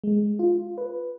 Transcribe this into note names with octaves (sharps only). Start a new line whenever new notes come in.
G#3
F4
B4